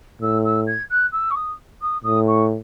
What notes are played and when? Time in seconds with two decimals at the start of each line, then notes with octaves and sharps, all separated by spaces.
0.22 A2 E6
0.44 E6
0.67 G#6
0.90 F#6
1.12 E6
1.31 C#6
1.35 D#6
1.81 D#6
2.04 A2 D#6
2.27 C#6